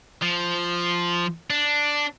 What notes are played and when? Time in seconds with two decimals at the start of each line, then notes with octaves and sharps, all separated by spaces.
0.22 F3
1.50 D4